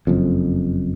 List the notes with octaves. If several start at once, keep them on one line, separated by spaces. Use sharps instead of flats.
F#1 F2